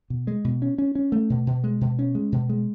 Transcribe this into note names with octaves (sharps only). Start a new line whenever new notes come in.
B2
G#3
B2
C#4
C#4
C#4
A3
B2
B2
G#3
B2
C#4
G#3
B2
G#3